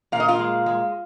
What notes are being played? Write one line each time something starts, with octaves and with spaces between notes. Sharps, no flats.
A#2 F5
D#5
F4 F5
G#3
G#3